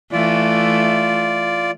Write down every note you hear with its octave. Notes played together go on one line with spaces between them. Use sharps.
E3 A3 F4 D5